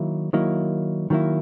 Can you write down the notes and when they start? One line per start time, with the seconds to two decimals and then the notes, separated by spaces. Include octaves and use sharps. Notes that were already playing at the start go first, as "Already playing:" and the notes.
Already playing: D#3 F#3 A#3 E4
0.33 D#3 F#3 A#3 E4
1.10 D#3 F#3 A#3 E4